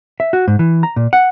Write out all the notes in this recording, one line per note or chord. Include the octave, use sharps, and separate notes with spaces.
E5
F#4
G#2
E3
A#5
A#2
F#5